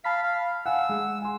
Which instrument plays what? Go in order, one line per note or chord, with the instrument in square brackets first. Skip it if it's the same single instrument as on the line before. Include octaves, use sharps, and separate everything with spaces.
[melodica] F5 [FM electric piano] A5 B5 B6
[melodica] F5
[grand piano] F5 G#5 [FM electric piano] F#5 [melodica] E6
[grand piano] G#3
G#5 C6